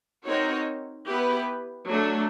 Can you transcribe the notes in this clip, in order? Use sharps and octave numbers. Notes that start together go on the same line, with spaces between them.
C4 D#4 F#4 A#4 C#5
B3 E4 G4 B4
F#3 A3 D4